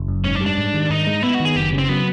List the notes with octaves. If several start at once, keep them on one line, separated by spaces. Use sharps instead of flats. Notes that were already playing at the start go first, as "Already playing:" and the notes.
Already playing: F#1
F#2
G#2 C#4
D4
G3
D4
G#2
D#3
G#2 D#4
G#3
B3 E4
F#4
D#3
G#4
F#1 G4
C#3
C4
F#3 B3